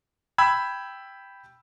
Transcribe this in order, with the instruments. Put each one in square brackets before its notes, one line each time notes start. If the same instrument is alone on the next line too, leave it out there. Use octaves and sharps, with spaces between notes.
[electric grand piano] G5 B5 E6 G#6